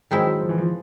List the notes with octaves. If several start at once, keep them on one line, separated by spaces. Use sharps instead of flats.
D#3 F#3 G#3 C4 E4
F3
E3
F3